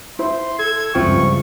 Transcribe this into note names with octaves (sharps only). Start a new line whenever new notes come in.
E4 C5 C6
A4 G#6
C#2 G2 F3 C4 E4 G5 C#6